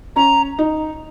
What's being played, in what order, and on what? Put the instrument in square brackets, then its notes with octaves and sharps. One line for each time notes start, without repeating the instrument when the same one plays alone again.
[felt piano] C#4 [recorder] A#5
[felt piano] D#4